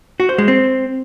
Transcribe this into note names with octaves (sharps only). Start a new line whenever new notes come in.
F#4
C5
G#3
C4